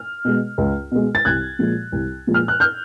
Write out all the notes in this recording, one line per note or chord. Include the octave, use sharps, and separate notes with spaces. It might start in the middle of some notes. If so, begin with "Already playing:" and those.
Already playing: F6
B2 G#3
C#2
B2 G#3
A6
C2 F#6 G#6
A#2 F3 G#3
C2
A#2 F3 G#3
F6
F#6
F6 G6